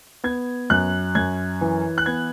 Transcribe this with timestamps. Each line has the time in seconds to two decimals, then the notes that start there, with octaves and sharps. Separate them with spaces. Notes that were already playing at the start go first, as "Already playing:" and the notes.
0.24 B3 G#6
0.70 F#2 F#6
1.15 F#2 G#6
1.61 E3
1.98 F#6
2.06 B3 G#6